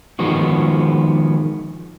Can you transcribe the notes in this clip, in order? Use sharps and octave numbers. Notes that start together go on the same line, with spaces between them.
D#3 F3 G#3 B3 F#4